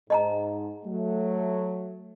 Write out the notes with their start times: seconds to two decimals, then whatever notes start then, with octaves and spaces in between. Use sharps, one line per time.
0.10 G#2 D#5 A5 A#5
0.85 F#3 A3